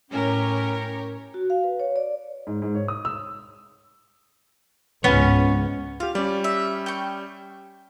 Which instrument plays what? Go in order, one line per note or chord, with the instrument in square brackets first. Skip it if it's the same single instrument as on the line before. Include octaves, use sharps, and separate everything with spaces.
[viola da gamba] A2 [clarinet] C#4 [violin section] G4 A#4 C#5
[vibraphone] F#4
F5
B4
C#5
D5
[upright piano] G#2
G#2
C#5
D#6
E6
[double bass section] C#2 G#2 [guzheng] B3 [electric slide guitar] C#4 C#5
[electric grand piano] F4 G4 [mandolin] F5
[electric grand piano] G3 C#4 [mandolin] D5
[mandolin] E5
G5 C#6